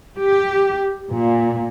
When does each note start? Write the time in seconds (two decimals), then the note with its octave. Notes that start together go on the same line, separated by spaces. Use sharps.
0.18 G4
1.10 A#2